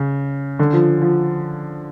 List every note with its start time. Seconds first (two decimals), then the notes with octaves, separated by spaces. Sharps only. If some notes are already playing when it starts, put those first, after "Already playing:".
Already playing: C#3
0.59 D3
0.73 F3
1.02 F3